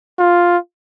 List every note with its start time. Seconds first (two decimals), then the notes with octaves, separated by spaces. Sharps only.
0.19 F4